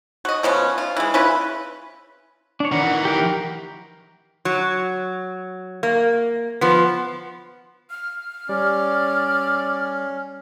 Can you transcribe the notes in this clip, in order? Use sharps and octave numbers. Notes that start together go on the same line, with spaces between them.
F#4 D#5
B2 F3 B3 C#4
F4
E3 G#3
C#4 E4 F4 B4
D4 C#5
D#3 E3 F#5
G4 A#4
F#3
A#3
F3 B3
F6
G3 C#4 D5